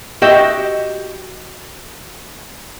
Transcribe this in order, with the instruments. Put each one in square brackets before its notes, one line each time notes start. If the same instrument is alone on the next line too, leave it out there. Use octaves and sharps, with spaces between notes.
[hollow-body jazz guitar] F#4 G4 D#5 E5 G5